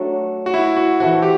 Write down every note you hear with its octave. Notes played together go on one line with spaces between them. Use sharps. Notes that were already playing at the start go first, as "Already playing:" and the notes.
Already playing: F#3 A3 D4 F#4
F#4
E4
F#4
E3 A3 C4 F#4
G4